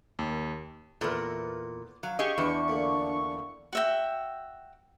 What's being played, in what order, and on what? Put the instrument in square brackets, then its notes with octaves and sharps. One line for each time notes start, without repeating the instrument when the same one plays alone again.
[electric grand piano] D#2
[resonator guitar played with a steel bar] E2 A#2 [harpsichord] B3 A4
[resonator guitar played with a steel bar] F#3 [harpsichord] F5
[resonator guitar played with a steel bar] G4 G#4 D#5 [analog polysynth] C#6
[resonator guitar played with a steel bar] E2 [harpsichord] E3 G5 [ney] D4
[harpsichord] A#2 D3
[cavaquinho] F#4 E5 G5